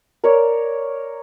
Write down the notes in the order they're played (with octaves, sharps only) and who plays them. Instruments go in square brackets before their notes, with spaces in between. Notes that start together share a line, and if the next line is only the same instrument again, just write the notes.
[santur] A#4 C#5 D5